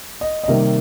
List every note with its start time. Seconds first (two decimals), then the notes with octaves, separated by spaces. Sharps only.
0.21 D#5
0.44 D#5
0.48 C3 D#3 G3 A#3 E5